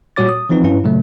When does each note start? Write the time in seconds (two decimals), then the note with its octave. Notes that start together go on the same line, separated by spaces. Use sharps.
0.16 A#2 G3 F#4 C#5 D6 A6
0.29 D#6
0.49 E3 F3 C4 D#4 B4
0.64 G2 C#4 E4 B4
0.84 A#2 C#3 F#3 A3